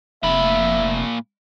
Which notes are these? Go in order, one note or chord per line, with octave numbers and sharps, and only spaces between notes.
F1 A#2 E5 B5